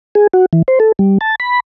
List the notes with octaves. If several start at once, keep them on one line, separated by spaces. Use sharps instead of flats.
G#4
F#4
E3
C5
A4
G3
A5
B5